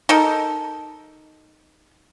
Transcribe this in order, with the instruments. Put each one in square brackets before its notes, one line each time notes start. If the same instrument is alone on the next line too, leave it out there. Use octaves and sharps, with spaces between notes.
[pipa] D#4 A4 A#4